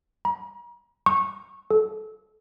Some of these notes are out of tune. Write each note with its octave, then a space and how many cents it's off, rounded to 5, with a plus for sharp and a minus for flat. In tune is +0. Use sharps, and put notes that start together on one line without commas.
A#5 +40
C#6 -15
A4 -25